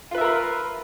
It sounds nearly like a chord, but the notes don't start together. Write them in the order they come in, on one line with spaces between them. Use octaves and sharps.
F4 B4 E5 A#4 B5